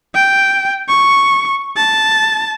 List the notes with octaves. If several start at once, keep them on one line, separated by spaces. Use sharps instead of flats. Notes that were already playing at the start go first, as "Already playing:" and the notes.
G5
C#6
A5